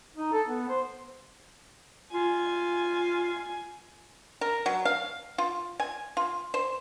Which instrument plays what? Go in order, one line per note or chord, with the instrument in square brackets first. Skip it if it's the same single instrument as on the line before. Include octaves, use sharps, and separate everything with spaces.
[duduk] D#4
A4
B3
C5
[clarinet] F4 [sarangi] G#5
[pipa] A#4
F#3
F5
F4
G#5
F4
C5